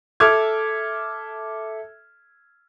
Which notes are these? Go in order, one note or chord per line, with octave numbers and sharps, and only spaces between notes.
A4 E5 D6 F6 G#6